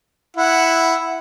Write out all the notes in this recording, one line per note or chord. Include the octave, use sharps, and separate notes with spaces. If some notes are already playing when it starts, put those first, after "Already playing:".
E4 F#5